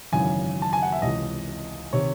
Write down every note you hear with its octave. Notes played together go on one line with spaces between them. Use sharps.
G#1 F#2 C#3 E3 G#5
A5
G#5
F#5
E5
C#2 C3 E3 D#5
C3 D#3 C#5